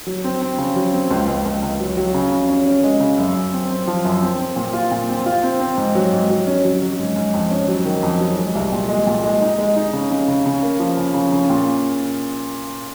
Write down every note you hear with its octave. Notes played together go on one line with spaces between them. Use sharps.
F#3
C4
C4
C#3
F#3
C4
C#2
C#2
C#2
C#2
F#3
F#3
C#3
C#3
C#4
C#4
G#3
C#3
F#2
F#2
C4
C4
F3
F#2
C4
C4
A#2
F4
A#2
C4
F4
C4
C4
G#2
F#3
G#2
F#3
C#4
F#3
F#3
G#2
G#2
F2
C#4
F#3
D#3
F2
F#3
G#3
C2
A#2
G#3
A#2
G#3
D#4
G#3
D#4
C#3
C#3
C#3
C#3
A#3
F3
C#3
C#3
C#3
A#2